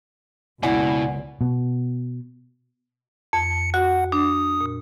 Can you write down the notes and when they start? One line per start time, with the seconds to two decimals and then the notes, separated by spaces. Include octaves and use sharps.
0.63 F#1 C#2 B2 E4 D5 F#5 G#5
1.41 B2
3.33 F2 C#7
3.74 F#4 F#5
4.12 D4 D#6
4.61 A#2